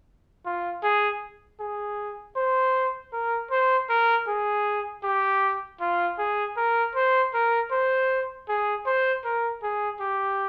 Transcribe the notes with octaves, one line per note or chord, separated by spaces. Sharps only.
F4
G#4
G#4
C5
A#4
C5
A#4
G#4
G4
F4
G#4
A#4
C5
A#4
C5
G#4
C5
A#4
G#4
G4